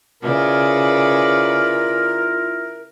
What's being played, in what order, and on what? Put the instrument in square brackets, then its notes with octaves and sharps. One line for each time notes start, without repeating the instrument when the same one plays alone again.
[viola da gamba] C#3 B4 D5 [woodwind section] E4 F4 A#4